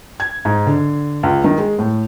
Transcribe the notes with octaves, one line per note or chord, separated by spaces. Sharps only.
G#6
G#2
D3
C#2
D#3
G#3
A2